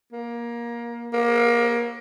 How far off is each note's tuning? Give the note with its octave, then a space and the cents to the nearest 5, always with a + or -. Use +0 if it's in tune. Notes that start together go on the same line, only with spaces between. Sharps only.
A#3 +20
A#3 +25